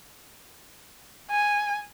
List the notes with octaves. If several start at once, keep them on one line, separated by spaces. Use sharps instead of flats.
G#5